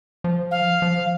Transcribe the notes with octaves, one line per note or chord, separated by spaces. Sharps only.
F3
F5
F3